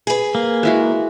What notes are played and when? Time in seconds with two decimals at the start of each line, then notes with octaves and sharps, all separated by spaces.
0.07 G#4 B4
0.35 A#3
0.63 G#3 E4 F#4